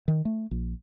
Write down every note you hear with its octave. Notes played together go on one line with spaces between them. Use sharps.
D#3
A3
A#1